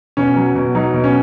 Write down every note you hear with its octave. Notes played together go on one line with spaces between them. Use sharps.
B2 C#4
F#3
B2
F#3 D#4
B2
C#4